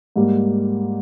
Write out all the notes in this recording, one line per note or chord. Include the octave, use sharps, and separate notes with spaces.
G#2 G3 A#3